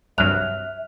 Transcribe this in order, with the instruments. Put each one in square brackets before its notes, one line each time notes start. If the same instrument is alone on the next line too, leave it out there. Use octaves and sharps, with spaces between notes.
[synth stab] C2 G2 F#3 [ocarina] E5 [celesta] F6 F#6 F7